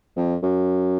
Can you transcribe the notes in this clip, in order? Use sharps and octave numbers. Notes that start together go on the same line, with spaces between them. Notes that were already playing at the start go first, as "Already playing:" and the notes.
F2
F#2